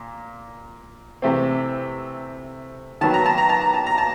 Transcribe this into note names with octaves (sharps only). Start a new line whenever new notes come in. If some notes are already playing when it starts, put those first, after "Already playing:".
Already playing: A#2
C3 E3 A3 C4
D#3 F#3 B3 A5
A#5
A5
A#5
A5
A#5
A5
A#5
A5